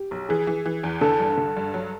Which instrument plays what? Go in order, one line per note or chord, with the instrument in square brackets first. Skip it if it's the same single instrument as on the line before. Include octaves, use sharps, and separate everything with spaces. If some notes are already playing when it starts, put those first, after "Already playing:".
Already playing: [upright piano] G4
[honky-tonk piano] B1
[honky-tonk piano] E3 [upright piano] G#4
[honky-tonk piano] E3
E3
E2
[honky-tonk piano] D3 [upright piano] A4
[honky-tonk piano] G2
D3
G2
F#3